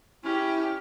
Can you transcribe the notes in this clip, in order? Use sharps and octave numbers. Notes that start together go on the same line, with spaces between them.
C#4 E4 G4